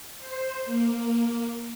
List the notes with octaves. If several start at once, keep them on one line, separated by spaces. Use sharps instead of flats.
C5
A#3